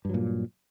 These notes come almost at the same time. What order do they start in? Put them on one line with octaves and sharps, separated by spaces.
G2 F#3 A#2